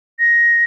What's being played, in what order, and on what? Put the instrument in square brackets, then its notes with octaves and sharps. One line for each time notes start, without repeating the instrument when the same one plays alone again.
[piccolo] A#6